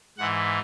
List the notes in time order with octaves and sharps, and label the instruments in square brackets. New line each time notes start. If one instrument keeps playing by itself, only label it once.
[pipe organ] G#2 E3 F#5